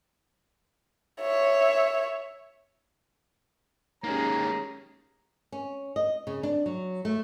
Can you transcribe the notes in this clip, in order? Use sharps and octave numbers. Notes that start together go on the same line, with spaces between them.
C#5 E5
G#3 A#3 C#4 D#4 G4 G#4 A#5
C#4
D#5
C#3
D4
F#3
A3